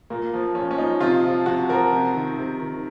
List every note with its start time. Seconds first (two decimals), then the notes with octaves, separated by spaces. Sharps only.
0.10 A#2 A#3
0.33 F3
0.55 A#2 C#4
0.71 C#4
0.78 F3 D#4
1.00 C3 F4
1.24 F3
1.46 C3 F#4
1.69 F3 A#4
1.93 C3
2.14 D#3
2.38 C3
2.60 D#3